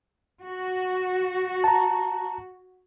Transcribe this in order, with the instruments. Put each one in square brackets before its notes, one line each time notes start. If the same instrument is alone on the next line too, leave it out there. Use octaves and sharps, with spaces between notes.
[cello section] F#4
[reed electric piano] A5 A#5